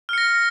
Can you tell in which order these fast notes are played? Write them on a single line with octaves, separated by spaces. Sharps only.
F6 C#7 A#6